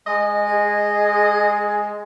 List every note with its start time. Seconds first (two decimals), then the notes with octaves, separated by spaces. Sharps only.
0.07 G#3 D#5
0.48 G#4